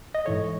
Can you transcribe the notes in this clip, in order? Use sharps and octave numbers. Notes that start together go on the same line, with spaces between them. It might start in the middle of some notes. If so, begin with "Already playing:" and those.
D#5
G#2 E3 A3 C#5